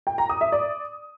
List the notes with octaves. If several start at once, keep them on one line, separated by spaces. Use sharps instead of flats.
G5
A#5
D#6
E5
D5